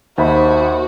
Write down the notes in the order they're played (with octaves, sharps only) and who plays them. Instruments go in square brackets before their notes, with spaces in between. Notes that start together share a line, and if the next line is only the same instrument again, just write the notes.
[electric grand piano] D#2 [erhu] F#4 [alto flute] C5 [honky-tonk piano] D#5 E5 B5